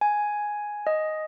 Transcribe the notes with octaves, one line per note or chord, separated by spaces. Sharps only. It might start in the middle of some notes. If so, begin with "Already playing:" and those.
G#5
D#5